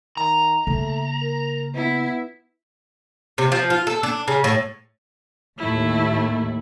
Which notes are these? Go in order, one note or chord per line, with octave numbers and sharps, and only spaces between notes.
D#3 A#5
C#3 A3 A#3
A#4
B3 E4
C3
F3
F4
A4
D4
C#3
A2
D#2 A2 A3 E4